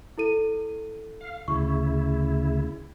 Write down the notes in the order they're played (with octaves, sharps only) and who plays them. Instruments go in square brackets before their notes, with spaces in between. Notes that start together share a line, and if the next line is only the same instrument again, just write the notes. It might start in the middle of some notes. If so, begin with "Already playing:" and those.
[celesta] E4 A4 D#7
[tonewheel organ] F5
[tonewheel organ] D2 C#3 E4 [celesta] C#6